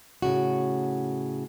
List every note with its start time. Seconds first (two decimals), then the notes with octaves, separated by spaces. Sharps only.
0.22 A2 C#3 F#4